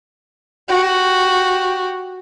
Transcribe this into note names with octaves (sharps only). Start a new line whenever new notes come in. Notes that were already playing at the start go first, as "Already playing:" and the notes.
F#4 G4